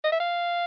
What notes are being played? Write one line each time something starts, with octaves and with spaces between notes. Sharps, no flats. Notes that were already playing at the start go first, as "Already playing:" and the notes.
D#5
E5
F5